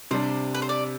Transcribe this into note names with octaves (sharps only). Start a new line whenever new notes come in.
C3 G3 D4 C5
B4
C5
D5